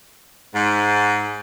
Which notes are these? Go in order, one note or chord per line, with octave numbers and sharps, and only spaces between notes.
G#2